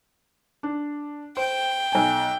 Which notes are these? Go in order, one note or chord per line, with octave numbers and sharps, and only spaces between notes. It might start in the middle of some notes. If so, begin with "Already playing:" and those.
D4
C5 G5
B1 G#5